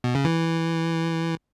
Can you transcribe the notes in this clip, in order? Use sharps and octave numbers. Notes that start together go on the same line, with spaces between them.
B2
C#3
E3